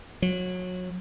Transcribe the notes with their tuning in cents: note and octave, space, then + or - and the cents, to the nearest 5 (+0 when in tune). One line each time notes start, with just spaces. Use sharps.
F#3 -25